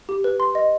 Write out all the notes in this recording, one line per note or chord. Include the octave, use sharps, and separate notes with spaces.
G4
B4
C6
D#5